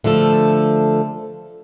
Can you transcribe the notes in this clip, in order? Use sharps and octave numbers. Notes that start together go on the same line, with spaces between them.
D3 F3 A3 A4